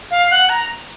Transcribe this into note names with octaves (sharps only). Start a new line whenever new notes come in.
F5
F#5
A#5